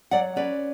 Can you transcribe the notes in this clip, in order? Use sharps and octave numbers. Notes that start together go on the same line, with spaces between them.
F#3 D5 F#5
C#4 B4 D5